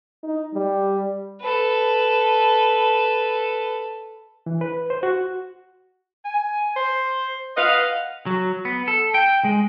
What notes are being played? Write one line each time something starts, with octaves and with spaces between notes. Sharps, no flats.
D#4
G3
A4 B4
E3
B4
C5
F#4
G#5
C5
B4 D#5 F5 F#5
F#3
B3
A4
G5
G#3